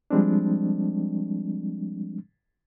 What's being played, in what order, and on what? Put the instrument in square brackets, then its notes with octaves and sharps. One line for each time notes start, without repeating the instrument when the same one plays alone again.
[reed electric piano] F3 G3 G#3 C4 D4